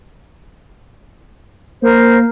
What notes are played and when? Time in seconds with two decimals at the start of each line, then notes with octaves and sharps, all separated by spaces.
1.82 A#3 A#4 C5